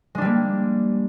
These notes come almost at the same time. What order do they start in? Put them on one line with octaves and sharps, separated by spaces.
G#3 D4 G3 A#3